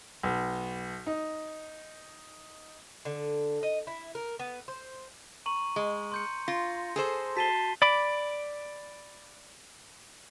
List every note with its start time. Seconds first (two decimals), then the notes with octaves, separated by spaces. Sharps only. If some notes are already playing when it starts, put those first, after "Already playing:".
0.23 B1
1.07 D#4
3.05 D3
3.63 D#5
3.87 E4
4.15 A#4
4.39 B3
4.68 C5
5.46 A#5 C#6 D#7 F#7
5.76 G#3
6.12 C6 G6 C#7
6.48 F4 A#6
6.96 G#4 A4 C5
7.37 F#4 A5 B6 C7 D#7 G7
7.82 D5 B5 D6